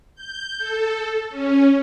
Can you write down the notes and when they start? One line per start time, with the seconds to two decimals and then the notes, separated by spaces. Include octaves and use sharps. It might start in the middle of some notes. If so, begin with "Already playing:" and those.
0.15 G6
0.58 A4
1.30 C#4